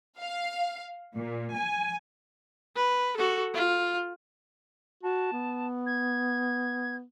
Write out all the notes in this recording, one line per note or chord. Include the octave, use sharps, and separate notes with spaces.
F5
A#2
G#5
B4
F#4 A4
F4
F#4 A5
B3
G#6